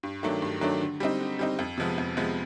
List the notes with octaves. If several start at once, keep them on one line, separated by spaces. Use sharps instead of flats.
G2
D#3 F#3 A3 D4
G2
D#3 F#3 A3 D4
D3
G3 C4 D#4
D3
G3 C4 D#4
F2
C3 F3 G#3 B3
F2
C3 F3 G#3 B3